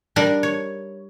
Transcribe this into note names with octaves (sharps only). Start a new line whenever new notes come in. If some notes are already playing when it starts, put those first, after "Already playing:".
G3 D4 A#4
C#5